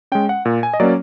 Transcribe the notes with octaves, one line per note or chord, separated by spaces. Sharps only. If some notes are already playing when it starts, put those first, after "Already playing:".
G#3 C#4 G5
F#5
A#2
G#5
D#5
F#3 A#3 C#4 D5